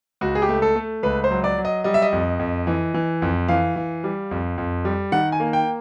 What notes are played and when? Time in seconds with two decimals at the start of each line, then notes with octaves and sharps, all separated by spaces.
0.21 C#2 F#4
0.35 G#4
0.42 G4
0.49 A3
0.62 A4
0.76 A3
1.03 C#2 B4
1.24 C5
1.31 F#3
1.44 D5
1.58 F#3
1.65 D#5
1.84 G3 D#5
1.94 E5
2.02 D#5
2.13 F2
2.39 F2
2.67 E3
2.94 E3
3.22 F2
3.48 E3 F5
3.76 E3
4.04 G3
4.31 F2
4.58 F2
4.85 G3
5.12 D#3 F#5
5.32 G#5
5.40 A#3
5.53 G5